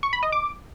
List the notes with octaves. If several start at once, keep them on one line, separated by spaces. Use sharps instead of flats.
C#6
B5
D#5
D6